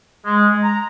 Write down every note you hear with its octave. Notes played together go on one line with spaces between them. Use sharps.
G#3
A#5